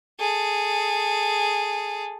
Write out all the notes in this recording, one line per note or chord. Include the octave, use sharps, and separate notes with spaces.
G#4 A4